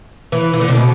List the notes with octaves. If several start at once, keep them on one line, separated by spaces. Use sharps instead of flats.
E3
E3
D3
C3
B2